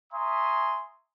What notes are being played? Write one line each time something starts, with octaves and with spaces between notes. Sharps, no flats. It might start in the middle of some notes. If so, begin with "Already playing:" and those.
E5 G#5 A#5 C6 C#6 D#6